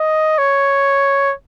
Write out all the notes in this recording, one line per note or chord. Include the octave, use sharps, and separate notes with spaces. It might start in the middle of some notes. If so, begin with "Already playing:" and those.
Already playing: D#5
C#5